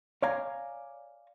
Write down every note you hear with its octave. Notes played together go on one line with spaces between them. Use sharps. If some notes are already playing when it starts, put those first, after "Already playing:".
C#5 D5 F5 G#5 A#5